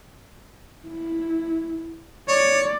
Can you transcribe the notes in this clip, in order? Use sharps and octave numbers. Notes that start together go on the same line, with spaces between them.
E4
C#5 D5